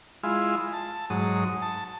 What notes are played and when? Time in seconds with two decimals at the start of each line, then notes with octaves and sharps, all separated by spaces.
0.23 G#3 E4 F4
0.73 A5
1.10 G#2 F#3 D#6
1.62 A5